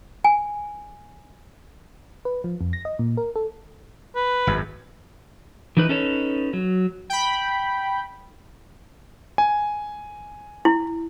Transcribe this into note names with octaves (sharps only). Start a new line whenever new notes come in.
G#5
B4
F3
F2
A#6
D#5
A#2
A#4
A4
B4
G#1 F#2
E3 D#4 B4
C#4 D#4 A4 B4 C#5
F#3
G5 B5
G#5
E4